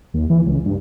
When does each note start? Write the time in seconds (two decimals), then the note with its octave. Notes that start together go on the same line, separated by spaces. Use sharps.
0.14 D#2
0.30 E3
0.46 C#2
0.66 G2